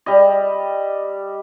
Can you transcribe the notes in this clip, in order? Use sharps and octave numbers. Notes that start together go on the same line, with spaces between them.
G3 D#5